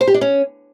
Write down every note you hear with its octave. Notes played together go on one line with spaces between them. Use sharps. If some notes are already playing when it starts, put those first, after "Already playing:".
C5
G4
D4
C#4